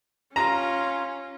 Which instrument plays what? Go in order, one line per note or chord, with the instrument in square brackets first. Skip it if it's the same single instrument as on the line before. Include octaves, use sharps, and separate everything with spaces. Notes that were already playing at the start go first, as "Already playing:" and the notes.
[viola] C#4 [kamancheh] F4 [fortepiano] A#5